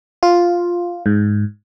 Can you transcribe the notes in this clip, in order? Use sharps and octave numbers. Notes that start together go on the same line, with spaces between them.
F4
G#2